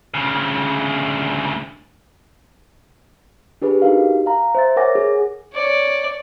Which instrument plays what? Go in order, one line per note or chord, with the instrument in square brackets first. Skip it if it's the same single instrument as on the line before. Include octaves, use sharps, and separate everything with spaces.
[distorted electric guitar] D2 C#3
[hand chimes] D4 G4 G#4 B4
D#4 F#4 G4 A#4 F5
F5 A#5
C5 E5 A6
A#4 C#5 F#5 G#5 D6 A#6
G#4
[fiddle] C#5 D5